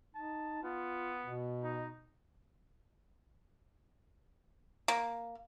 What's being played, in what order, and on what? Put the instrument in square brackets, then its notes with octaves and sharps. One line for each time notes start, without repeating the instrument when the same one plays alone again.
[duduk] D#4 [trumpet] A5
[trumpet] B3 [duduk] F4
[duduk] B2
[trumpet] D#4
[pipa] A#3